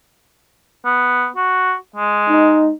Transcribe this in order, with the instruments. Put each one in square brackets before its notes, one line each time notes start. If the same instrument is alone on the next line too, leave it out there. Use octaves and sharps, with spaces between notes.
[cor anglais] B3
F#4
G#3
[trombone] D#4